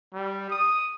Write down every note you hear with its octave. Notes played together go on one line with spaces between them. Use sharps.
G3
D#6